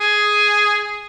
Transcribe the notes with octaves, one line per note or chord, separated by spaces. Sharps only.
G#4